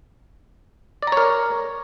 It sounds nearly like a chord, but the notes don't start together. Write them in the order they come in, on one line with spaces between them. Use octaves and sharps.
D5 A#5 C#5 A#4